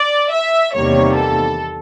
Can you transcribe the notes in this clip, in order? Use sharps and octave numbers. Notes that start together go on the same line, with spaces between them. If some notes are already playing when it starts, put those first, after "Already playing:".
Already playing: D5
E5
E2 C3 D#3 G3 A#3 C#5
A4